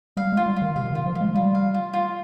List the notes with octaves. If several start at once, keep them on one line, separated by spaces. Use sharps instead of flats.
G3 F5
G#3
F4
G3
F4
D#3
C3 F5
D#3
F4
F3
F4
G#3
G3 F4
F5
F4
F4